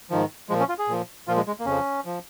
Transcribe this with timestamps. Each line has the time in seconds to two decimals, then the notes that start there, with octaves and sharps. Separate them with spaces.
0.10 G#2 D#3 F3
0.49 A#2 F3 G#3
0.60 C#4
0.69 F4
0.79 G#4
0.88 A#2 F3
1.28 A#2 F3 F4
1.36 G#3
1.47 G#3
1.60 A#3
1.65 F2 C#3 F3 C#4
2.05 F3